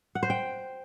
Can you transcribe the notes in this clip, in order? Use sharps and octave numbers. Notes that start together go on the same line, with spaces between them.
F#5
C5
G5